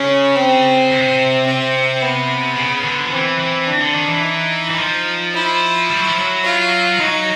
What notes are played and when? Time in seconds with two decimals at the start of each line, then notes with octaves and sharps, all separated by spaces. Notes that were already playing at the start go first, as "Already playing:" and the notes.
Already playing: C#3 C#4
0.35 C4
0.91 C3
1.46 C4
2.01 B3
2.57 C#3
2.85 D3
3.06 F3
3.12 E3 C4
3.40 E3
3.67 D4
3.81 D3
3.95 D#3
4.09 E3
4.23 D#4
4.70 E3
4.79 F3
5.34 E4
5.89 G3
6.00 F#3
6.09 F3
6.20 F#3
6.44 F4
6.99 F#3 D#4